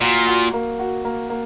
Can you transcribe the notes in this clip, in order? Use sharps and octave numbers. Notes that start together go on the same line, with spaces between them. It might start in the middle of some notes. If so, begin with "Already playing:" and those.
A#2 F#4
F#4
A#3
F#4
A#3
A#3